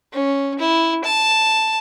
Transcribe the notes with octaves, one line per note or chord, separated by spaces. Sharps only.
C#4
E4
A5